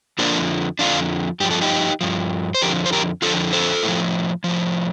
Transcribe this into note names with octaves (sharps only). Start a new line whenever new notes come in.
F2 D3 F3 A#3 D4
F2 D3 F3 D4 F4
G2 F3 G4
A4
D#4 G4
G2 F3
C5
F2 D3 F3 G4 A#4
C5
G4 A#4
F2 D3 F3 F4 A4
A4 C5
A2
F3
A2 F3